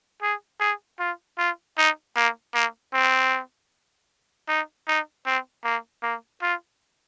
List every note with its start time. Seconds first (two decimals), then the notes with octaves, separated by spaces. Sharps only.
0.22 G#4
0.60 G#4
0.99 F4
1.38 F4
1.77 D#4
2.16 A#3
2.54 A#3
2.93 C4
4.49 D#4
4.88 D#4
5.26 C4
5.64 A#3
6.03 A#3
6.42 F4